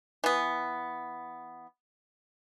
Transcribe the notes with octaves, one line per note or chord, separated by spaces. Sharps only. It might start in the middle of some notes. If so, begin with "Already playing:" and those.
E3 B3